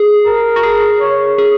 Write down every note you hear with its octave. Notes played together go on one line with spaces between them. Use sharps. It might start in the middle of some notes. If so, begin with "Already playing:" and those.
Already playing: G#4
A#4
F#4
G#4
C#5
G#4